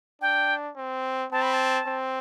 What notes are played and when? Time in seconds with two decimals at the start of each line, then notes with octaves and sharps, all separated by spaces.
0.21 D4 G5
0.76 C4
1.32 C4 A5
1.42 B5
1.53 A5
1.86 C4